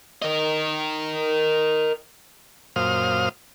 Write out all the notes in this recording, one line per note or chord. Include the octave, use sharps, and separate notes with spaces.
A#4 D#5
F#2 A#2 C5 F5 D#6 F6